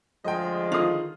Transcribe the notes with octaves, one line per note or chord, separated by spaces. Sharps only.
D2 F3 G#3 D#5 G5
D3 D#3 F4 D#6